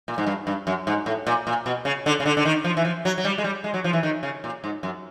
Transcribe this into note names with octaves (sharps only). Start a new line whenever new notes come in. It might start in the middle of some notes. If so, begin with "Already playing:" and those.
A#2
G#2
G2
G2
F#2
G#2
A2
A#2
A#2
B2
C#3
D3
C#3
D3
D3
D#3
F3
E3
F3
F#3
F#3
G3
G#3
G3
G#3
F#3
F3
E3
D#3
C#3
A#2
G#2
F#2